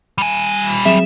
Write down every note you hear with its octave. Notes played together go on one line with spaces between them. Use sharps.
G3 G#5
F#3 C4 G#4 E5 E7